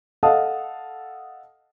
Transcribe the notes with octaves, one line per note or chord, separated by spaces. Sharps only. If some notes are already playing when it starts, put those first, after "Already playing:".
A4 D#5 F5 F#5 A5 D#6